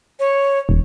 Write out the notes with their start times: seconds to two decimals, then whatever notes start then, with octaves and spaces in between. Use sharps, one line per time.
0.19 C#5
0.69 D#1